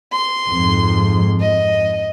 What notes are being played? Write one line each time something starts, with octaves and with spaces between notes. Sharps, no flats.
C6
F2 G#2
D#5